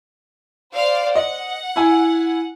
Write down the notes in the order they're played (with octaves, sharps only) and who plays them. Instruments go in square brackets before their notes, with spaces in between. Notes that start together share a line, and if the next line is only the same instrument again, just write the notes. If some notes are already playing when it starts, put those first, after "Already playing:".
[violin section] C5 D5 F5
[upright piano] D#5 [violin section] F#5
[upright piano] E4 G#5